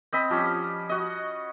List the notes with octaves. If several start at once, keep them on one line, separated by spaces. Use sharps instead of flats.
C4 D#5 B5
F3 G3 C#4
F#4 D#5